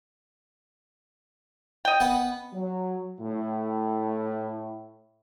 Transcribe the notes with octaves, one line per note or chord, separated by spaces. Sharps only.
D#5 G5
B3 F#5
F#3
A2